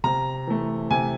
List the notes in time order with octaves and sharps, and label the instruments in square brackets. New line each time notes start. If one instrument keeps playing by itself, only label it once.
[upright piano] C3 [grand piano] A#5
[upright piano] E3 A3
[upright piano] C3 [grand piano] G#5